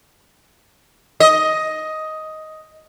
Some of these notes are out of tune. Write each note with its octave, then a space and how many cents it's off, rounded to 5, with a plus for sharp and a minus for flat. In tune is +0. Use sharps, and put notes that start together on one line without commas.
D#5 +10